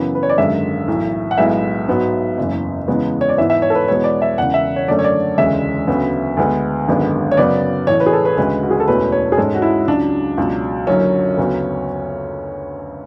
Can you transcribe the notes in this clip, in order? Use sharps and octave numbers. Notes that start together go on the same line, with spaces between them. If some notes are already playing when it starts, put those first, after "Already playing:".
Already playing: F#2 C#3 E3 B3
B4
C#5
D5
G#1 F#2 D3 G#3 E5
B1 A2 E3
F#5
B1 A2 G#3 B3 E5
G#2 F#3 B3
F#1 E2 C#3 E3
E2 C#3 G#3 B3
C#5
D5
G#2 E3 B3 E5
E5
C#5
A4
B4
E2 B2 G#3 B3 C#5
D5
E5
E1 E2 C#3 F#5
E5
C#5
F#2 D3 A3 C#4 D5
C#5
D5
E1 D2 C#3 G#3 C#4 E5
D2 C#3 F#3 B3
D2 D3 G#3 B3
G#1 F#2 D3 G#3 B3
C#5
F#2 C#3 F#3 B3 D5
A1 A2 E3 C#5
B4
G#4
A4
B4
D2 C#3 G#3 B4
F#4
G#4
A4
E1 E2 B2 A3 C#4 B4
C#5
G#4
G#2 G#3 C#4 A4
F#4
E4
C#2 C#3 F#3 D4
C#2 B2 F#3
F#1 F#2 D3 F#3 C#4
D2 C#3 F#3 B3